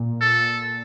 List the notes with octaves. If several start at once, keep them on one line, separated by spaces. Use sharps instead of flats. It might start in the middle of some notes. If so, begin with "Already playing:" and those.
Already playing: A#2
A4